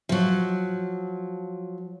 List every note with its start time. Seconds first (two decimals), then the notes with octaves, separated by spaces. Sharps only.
0.09 F3 F#3